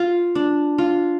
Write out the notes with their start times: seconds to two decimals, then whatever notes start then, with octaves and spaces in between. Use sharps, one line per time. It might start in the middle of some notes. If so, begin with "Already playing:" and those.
Already playing: F4
0.35 D4
0.78 F4